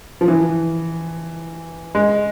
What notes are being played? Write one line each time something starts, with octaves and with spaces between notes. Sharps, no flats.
F3
E3
G#3